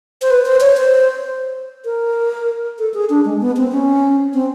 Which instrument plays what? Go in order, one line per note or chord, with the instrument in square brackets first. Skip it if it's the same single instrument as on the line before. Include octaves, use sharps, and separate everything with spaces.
[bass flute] C5
B4
C5
C#5
C5
A#4
A4
G#4
D4
G#3
B3
C4
C#4
C4